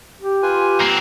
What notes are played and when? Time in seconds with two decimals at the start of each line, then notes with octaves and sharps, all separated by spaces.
0.21 G4
0.43 F4 B4 G#5
0.81 A#3 C4